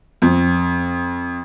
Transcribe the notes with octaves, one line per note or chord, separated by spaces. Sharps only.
F2